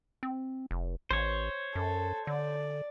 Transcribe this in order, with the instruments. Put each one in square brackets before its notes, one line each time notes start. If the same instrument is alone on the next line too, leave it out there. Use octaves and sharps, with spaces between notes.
[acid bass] C4
F1
[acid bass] A1 [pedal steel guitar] C5 C#5
[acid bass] F#2 [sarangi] A4
[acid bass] D3 [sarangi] D5